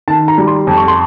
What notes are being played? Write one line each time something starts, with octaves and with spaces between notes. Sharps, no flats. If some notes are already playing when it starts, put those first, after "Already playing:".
D#3 A5
A#5
G3
C6
F2
C#6
C6